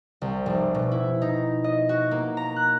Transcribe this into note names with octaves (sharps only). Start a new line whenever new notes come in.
C2
F1
B2
E4
D#4
D#5
F#4
A#3
A#5
F#6